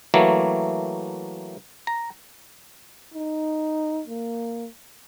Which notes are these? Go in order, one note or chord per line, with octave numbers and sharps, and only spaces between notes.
E3 F#3 A3 A#3
A#5
D#4
A#3